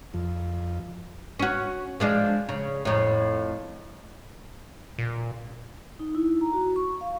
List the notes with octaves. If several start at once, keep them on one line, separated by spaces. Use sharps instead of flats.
F2
C#4 F#4
F3 G#3 D4
C#3
F2 A2
A#2
D#4
E4
A#5
F#4
C#6
F5